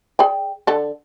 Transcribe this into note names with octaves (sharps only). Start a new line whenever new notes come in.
G#4 D5 G5
D3 A4